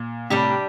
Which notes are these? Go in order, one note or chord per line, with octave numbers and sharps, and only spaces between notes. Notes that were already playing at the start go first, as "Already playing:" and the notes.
Already playing: A#2
A2 C3 G3 D4 G4